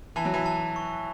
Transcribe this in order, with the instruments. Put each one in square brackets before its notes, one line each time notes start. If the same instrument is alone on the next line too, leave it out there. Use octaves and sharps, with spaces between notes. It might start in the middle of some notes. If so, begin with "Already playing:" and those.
[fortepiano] E3 [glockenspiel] A5
[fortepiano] F#3
E3
[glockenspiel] A5
C#6